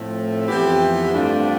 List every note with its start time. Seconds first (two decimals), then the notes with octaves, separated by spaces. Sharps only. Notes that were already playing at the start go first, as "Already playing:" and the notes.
Already playing: A2 F3 A3 C4
0.47 F2 E3 B3 E4 G4
1.13 G2 D3 A3 C4 D4 F4